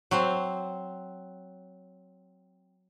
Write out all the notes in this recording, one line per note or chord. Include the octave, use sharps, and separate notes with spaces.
F#3 C4 C5